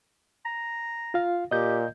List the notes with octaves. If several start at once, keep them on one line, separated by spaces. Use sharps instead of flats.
A#5
F4 F5
A#2 G4 D#5 G6